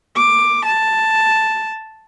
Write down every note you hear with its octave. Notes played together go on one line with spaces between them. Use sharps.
D6
A5